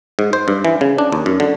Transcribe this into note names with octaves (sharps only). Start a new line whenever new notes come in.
G#2
C5
G2
E3
C#3
D4
D#2
F#2
D3